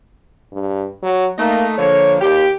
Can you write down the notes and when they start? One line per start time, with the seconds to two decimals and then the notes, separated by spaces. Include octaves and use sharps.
0.52 G2
1.03 F#3
1.38 A3 A#3 D#4
1.78 D3 F3 A#3 C#5
2.21 D#2 G4